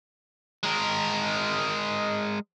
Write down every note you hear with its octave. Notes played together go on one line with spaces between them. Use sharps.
G#3 A#4